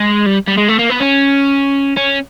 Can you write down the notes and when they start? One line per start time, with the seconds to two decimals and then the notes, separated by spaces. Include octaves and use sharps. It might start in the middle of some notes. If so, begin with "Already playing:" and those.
Already playing: G#3
0.26 G3
0.48 G3
0.58 G#3
0.69 A3
0.79 A#3
0.90 B3
1.01 C#4
1.97 C#4